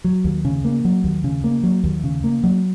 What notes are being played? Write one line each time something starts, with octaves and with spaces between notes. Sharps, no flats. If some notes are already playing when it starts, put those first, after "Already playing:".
F#3
D#2
C#3
A#3
F#3
D#2
C#3
A#3
F#3
D#2
C#3
A#3
F#3